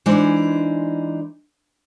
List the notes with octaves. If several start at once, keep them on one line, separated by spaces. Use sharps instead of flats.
E3 G#3 D4 D#4 C5